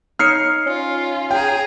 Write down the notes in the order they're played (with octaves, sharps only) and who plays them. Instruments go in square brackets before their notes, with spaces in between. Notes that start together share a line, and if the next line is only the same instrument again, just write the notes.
[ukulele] D#4 C#5 [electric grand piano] F6 C7 C#7
[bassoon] C#4 [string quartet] F4
[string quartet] G#4 A#5 [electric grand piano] G5